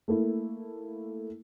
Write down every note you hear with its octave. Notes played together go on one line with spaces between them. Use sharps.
A3 A#3 E4